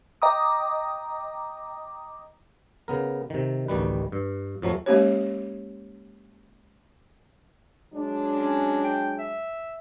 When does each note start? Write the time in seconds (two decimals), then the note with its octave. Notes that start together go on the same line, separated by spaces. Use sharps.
0.22 D#5 G5 A#5 D6 D#6
2.88 C#3 B3 A#4
3.30 C3 D#3
3.68 A1 D2 D#3 G3 B4
4.12 G2
4.62 F2 F3 F#3 A3
4.86 G#3 A#3 C#4 G4 C#5
7.93 F#3 G#3 D4
8.39 C#4
8.84 G5
9.19 E5